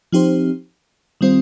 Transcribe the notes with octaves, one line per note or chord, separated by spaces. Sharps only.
F3 C4 D#4 G4 C5
D#3 G3 C4 F4 C5